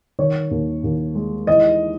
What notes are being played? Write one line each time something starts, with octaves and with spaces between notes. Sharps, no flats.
D#3 C#5
D#2
D#2
G#3
E3 D#5